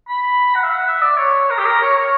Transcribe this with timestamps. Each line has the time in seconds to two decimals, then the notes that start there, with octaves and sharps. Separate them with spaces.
0.08 B5
0.55 F#5
0.63 E5
0.70 F#5
0.87 E5
1.02 D5
1.18 C#5
1.50 A#4
1.58 G4
1.66 A#4
1.82 C#5
1.97 C#5